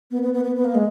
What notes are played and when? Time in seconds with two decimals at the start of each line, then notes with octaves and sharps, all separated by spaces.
0.11 B3
0.22 B3
0.33 B3
0.44 B3
0.55 B3
0.64 A#3
0.75 G#3